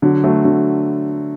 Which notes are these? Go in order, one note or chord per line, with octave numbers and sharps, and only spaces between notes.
D3 F#3
F#3 A3
D3 F#3